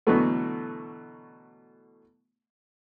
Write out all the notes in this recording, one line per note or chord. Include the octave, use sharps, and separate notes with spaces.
B2 D3 E3 F#3 A3 B3